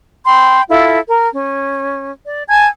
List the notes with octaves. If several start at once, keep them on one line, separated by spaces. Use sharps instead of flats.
G5 B5 C6
E4 F4 A4
A#4
C#4
D5
G#5 A5 G#6